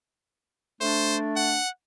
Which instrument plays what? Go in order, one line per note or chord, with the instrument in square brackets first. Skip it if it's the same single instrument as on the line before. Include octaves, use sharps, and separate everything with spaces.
[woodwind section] A3 D4 [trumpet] C5
[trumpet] F#5